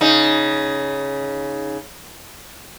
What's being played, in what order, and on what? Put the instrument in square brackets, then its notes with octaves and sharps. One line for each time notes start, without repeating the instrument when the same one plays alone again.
[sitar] C#3 D#4